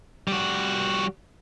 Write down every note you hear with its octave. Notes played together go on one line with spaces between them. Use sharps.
G3 F#4